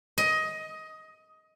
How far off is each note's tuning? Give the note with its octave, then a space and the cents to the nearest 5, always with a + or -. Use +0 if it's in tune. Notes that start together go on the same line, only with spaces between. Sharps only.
D#5 +15